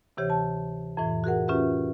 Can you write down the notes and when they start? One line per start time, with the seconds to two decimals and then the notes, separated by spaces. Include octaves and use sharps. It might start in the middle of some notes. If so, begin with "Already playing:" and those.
0.17 D2 C3 E3 G4 C#5
0.30 A5
0.97 F2 A2 E3
1.24 F#4 G#4 A#4 F#5
1.48 C#4 F4 G4 B4 E5